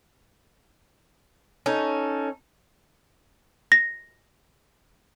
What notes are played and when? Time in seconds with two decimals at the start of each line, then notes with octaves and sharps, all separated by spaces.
1.66 C#4 D#4 A4
3.72 A#6